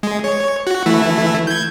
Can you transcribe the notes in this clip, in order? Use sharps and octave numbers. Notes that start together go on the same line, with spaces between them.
G#3
C#5
F#4
E3 A3 E4
G6 G#6